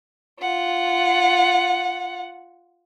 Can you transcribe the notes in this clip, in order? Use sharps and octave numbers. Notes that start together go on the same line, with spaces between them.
F4 F#5